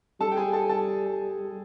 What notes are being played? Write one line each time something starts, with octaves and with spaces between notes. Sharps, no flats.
G3 A4 A5
G5
G#4 G#5
A4 A5
A4 A5